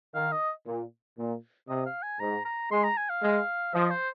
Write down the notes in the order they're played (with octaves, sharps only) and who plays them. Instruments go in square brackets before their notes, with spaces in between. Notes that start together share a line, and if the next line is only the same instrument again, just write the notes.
[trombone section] D#3 [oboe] F5
[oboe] D#5
[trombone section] A#2
A#2
[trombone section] C3 [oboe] D#5
[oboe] F5
G#5
[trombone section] G#2 [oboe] A#5
[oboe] A#5
[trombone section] G#3 [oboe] C6
[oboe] A#5
G#5
F5
[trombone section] G#3
[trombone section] F3 [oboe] D#5
[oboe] C5